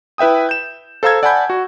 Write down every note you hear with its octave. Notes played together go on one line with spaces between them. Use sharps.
E4 B4 E5 G5 D#6
G6 E7
A4 C5 F5 A#5 E6 G#6
D5 F#5 G#5 A5 B5 G6
F#4